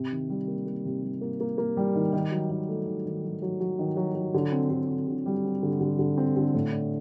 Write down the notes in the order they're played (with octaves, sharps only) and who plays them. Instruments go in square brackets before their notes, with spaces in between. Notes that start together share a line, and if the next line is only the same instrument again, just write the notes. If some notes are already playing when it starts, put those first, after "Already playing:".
Already playing: [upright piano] C3
D#3
G3
A#3
A#3
C3
G3
A#3
A#3
A#3
G3
D#3
D#3
F#3
D#3
A3
D#3
D#3
F#3
F#3
F#3
D#3
F#3
F#3
D3
C4
D3
C4
D3
G3
C4
D3
D3
D3
C4
D3
A2
D4